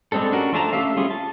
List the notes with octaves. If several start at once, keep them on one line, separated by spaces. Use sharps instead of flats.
G3 G#3 C4 D4 A4
C#4 D4 F#4 A#4
F3 A3 D4 A5 A#5
A3 C#4 G4 E5 F5
G3 C#4 F4 G#4
A5